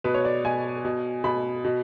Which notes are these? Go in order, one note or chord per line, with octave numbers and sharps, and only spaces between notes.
B2 B4
C#5
D5
B2 G#5
B2
B2 B5
B2